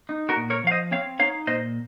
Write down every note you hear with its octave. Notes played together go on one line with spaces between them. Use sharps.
D#4
F#4 A#4
A#2
A#4 C#5
F3 F5
C5 D#5
C4 C#5 F5
D#4 C#5 F5
A#2 C5 D#5